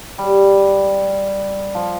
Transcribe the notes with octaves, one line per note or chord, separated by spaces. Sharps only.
G3
F3